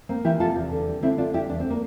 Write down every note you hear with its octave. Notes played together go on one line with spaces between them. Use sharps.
A#3 C4
E3 E4 G4
C3 F4 A4
E2
D3
G3
D3 C4 E4
D3 D4 F4
G3 E4 G4
E2 D4
C4
A#3